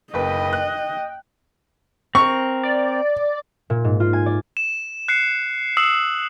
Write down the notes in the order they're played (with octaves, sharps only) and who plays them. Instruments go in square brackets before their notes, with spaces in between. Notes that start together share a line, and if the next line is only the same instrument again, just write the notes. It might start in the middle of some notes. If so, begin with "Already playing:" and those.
[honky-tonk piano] F#1 B4 [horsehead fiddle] D#5 [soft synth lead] G5
[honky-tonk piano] F#6
[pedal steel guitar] C4 A#4 [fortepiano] C#6
[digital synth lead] D5
[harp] A#2
G#2
F4
G#5
D5
[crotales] E7
F#6 C7 C#7
D#6 E6 C7 C#7 E7 F#7